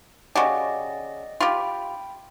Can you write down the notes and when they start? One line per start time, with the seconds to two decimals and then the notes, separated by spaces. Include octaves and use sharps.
0.35 C#3 F#4 G4 D5 D#5
1.41 F4 G4 G5 B5